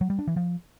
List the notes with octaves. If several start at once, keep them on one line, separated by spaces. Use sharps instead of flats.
F#3
G3
D4
E3
F3